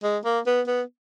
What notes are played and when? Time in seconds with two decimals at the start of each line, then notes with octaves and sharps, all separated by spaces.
0.03 G#3
0.25 A#3
0.46 B3
0.67 B3